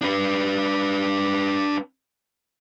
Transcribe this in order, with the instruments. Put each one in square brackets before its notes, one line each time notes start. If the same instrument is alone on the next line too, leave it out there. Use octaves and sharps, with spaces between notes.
[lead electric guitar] D4 B4